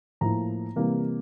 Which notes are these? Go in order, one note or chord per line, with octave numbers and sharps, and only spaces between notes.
A2 F3 A#3 E4 A#5
C3 E3 G3 A#3